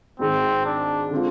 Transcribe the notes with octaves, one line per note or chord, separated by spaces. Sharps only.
G#1 G#2 D#3 G#3 C4
D4
D3 G#3 C4 F4